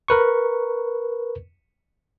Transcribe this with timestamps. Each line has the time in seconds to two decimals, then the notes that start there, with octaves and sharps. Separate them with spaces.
0.08 A#4 B4 C#6